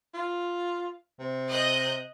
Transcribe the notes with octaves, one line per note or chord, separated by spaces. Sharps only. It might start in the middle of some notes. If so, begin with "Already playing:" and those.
F4
C3
D#5 F#6 G6